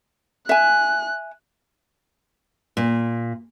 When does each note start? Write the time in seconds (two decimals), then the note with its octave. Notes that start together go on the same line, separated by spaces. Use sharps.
0.49 E5 G#5 F#6
2.77 A#2